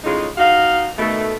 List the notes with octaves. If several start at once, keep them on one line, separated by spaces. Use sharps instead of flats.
A2 C#3 G#3 D#4 F4
D#4 F#4 F5
B2 D#3 A3